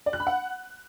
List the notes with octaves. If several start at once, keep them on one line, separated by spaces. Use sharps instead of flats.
D5
F#6
B5
F#5